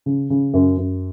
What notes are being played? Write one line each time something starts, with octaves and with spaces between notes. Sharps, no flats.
C#3
C#3
F#2
F#2